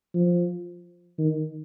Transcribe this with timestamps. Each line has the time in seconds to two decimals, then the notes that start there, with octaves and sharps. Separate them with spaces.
0.14 F3
1.19 D#3